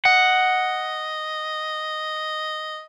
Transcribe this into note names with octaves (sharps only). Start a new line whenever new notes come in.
D#5 F#5